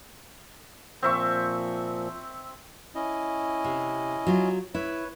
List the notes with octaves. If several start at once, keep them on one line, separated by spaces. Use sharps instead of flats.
A#2 F3 C4 E5 C#6
C#4 E4 D#5
C3
F#3 F4
E4 B4 C#5